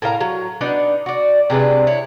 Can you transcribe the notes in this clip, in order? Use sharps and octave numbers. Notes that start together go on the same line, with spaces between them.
A2 A#4 F5 A#5
F#3
B3 D4 D#4 F#5
F#4 D5
C3 G#3 D4 B4
E4 C#5